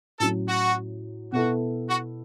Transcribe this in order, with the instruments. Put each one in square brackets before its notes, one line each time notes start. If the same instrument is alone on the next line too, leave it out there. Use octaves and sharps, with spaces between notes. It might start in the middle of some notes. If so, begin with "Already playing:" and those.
[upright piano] A2 F#3 C#4 [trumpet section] A4
[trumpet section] F#4
[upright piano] B2 B3 E4 A4 [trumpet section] F#4
[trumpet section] F#4